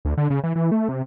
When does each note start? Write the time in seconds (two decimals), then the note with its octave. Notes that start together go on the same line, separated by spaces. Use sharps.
0.05 D2
0.17 D3
0.30 C#3
0.43 E3
0.55 E3
0.71 A3
0.89 C3